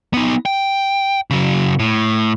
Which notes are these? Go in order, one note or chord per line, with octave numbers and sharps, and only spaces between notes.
B3 D#4
G5
C#3 F#3
A2